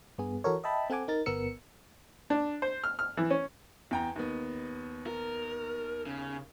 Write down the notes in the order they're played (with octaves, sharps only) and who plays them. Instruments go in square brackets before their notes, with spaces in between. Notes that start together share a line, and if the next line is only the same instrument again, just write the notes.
[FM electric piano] G2 B3 G#4
E3 F#4 A4 A#4 C#5
D#5 E5 G5 A5 B5
C4 A4 F#5 G#5 D6
D#4 A#4 A6
G1 B3 A#4 E6 C#7
[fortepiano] D4
C5
F6
F6
E3
C#4
[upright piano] E2 G5 A#5
D#2 B3
[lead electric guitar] A#4
C#3